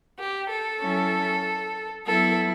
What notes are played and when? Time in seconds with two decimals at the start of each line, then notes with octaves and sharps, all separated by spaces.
0.18 G4
0.49 A4
0.80 F#3 C#4 E4
2.06 F#3 B3 E4 A4